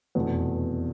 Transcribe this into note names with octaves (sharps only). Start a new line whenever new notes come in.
F1 E2 B2 A3